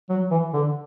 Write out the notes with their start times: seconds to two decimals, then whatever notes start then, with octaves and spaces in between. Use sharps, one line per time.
0.09 F#3
0.31 E3
0.54 D3